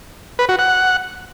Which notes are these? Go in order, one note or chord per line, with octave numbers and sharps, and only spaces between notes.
B4
F#4
F#5